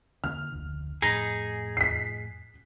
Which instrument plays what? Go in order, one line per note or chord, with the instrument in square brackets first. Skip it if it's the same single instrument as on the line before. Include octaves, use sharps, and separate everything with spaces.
[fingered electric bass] D3 A#3 [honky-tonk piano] F6
[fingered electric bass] F1 D2 D3
[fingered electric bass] F2 A2 [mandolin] D#4 [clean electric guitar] G#4
[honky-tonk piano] B6 C7